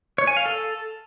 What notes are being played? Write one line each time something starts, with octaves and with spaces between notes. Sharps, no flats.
C#5
G#5
F5
A4